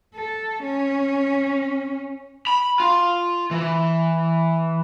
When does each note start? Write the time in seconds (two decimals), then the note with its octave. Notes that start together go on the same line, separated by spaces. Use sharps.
0.15 A4
0.63 C#4
2.47 B5
2.80 F4
3.51 E3